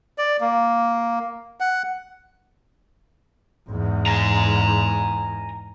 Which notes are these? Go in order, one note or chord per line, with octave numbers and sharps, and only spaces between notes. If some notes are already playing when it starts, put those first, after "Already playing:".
D5
A#3
F#5
E2 G#2
G#5 A#5